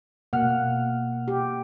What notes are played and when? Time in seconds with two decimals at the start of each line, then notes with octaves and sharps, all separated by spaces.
0.33 B2 A#3 F#5 F6
1.28 G4